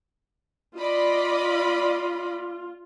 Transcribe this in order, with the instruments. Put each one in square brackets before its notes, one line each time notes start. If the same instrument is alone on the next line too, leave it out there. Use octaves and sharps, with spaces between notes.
[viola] F4 [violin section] D5 D#5 B5